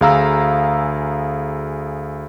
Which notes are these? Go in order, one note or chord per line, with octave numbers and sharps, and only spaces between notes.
D2 G#4 F5 A#5 E6